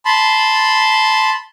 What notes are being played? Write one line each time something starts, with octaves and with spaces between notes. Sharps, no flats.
A5 B5 C6